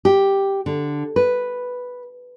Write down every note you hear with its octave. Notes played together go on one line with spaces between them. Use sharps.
G4
D3
B4